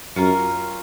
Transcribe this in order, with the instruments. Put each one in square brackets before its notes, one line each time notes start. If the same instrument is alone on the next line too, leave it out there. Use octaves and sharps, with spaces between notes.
[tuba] F#2 [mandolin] C#4 F4 A#4